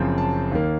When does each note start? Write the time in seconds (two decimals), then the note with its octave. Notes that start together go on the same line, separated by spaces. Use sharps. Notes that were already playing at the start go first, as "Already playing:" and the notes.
Already playing: F#1 F#2 F3 C4
0.18 A5
0.51 D#2 D#3 A#3